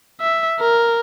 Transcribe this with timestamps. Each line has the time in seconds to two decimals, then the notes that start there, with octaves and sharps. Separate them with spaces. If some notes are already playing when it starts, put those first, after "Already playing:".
0.21 E5
0.60 A#4